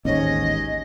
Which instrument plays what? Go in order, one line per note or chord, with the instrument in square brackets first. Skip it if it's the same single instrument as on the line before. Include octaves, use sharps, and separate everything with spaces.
[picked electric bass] A1 [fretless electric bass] D#2 G#2 [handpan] C#4 C#5 [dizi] D#5